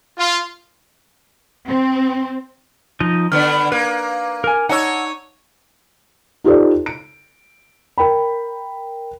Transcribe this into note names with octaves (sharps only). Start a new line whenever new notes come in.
F4
C4
F3 D#4 D#5
D3 B3 D4 F6
A#3 B4
A#4 G#5
D#4 C#5 F#5 A5 E6
D#4 F4 G4 A4 C5 D5
D7
A#4 G5 B5